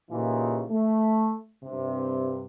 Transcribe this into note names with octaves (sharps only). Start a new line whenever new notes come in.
A#2 C#3 E3 D#4 F4 G4
A3
G2 C3